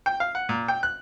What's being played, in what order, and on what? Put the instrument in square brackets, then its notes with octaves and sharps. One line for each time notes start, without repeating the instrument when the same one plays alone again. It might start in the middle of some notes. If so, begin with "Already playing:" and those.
[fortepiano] G5
F5
F#5
A#2
G5
F#6